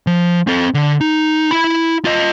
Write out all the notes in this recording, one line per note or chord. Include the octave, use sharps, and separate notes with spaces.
F3
C4 A4
D3
D#4
E4 B5
F4 D#5